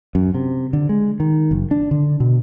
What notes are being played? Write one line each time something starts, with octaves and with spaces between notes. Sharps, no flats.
F#2
C3
D3
G#3
D#3
F#1
D4
D3
B2